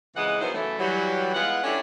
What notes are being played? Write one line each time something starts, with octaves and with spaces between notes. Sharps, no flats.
F2 C#3 E3 G#3 D#5 F#5
D#3 F3 F#3 B3 E4 C5
C#3 E3 F#3 A3
E3 F#3 G3
E3 G#3 B3 F4 F#5
G3 C#4 D4 E4 A4